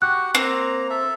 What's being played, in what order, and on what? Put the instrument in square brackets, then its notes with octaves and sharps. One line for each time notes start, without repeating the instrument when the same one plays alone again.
[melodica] F#4 G4 F#5 [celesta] F#6
[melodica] A#3 A#5 [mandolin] C4
[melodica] A4 E5